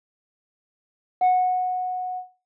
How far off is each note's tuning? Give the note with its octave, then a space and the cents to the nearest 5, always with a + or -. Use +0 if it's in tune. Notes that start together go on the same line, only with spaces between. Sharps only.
F#5 -15